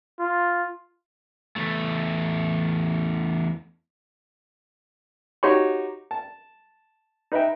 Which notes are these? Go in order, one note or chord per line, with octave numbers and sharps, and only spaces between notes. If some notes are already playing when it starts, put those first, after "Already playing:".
F4
E2 A3
D#4 F#4 G4 C#5 C6 C#6
A5
D#4 B4 D#5 E5 G5